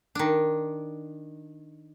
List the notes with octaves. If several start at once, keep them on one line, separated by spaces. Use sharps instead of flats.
D#3 D4